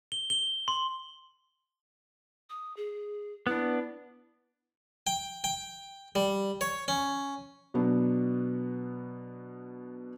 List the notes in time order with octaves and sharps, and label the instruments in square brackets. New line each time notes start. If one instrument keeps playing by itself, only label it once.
[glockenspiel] G7
G7
C6
[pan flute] D#6
G#4
[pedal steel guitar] B3 D4 [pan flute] E4
[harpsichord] G5
G5
G3
C#5
C#4
[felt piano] B2 F#3 B3 D4